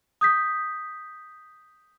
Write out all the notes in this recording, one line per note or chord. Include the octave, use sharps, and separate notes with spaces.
D#6 G6 B6